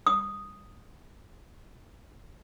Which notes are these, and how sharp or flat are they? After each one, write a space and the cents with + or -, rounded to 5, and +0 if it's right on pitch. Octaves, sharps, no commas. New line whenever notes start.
D#6 +0